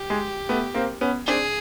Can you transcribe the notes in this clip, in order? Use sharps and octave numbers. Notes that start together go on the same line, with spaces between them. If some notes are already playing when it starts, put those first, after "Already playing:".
Already playing: G4
G#3
A3 B3
A#3 C4
B3 C#4
C4 D4 G#4